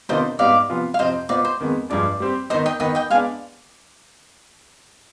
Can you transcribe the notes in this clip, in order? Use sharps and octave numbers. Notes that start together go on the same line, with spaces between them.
C3 D#3 B3 D4 F4 C5 D#5
G#2 G3 B3 D#4 D5 F5
C3 F3 B3 F4
F5
F2 C3 F3 C4 C5 D#5
B2 B3 F4 C5 D5 D#5
C5
F2 D#3 G#3 B3
G2 F3 G#3 D4 D5
G3 C4 G4
D#3 B3 D#4 C5 D#5
D#5 G5
D#3 B3 D#4 B4 D#5 G5
D#5 G5
G#3 B3 D4 F5 G#5